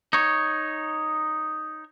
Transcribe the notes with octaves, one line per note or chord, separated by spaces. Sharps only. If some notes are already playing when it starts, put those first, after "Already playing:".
D#4 C#5